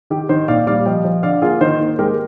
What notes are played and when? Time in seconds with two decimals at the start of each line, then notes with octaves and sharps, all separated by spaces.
0.10 D#3 G4
0.29 D#3 C5 D#5
0.48 A#2 D5 F5
0.67 G3 D5 F5
0.86 F3 D#5 G5
1.05 F3
1.23 D3 D5 F5
1.42 A#3 F4 G#4
1.61 D#3 C5 D#5
1.80 A#3
1.99 G#3 G4 A#4